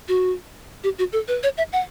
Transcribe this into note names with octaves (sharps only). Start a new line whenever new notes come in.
F#4
G4
F#4
A4
B4
C#5
E5
F#5